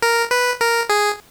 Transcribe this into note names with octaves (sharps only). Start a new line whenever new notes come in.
A#4
B4
A#4
G#4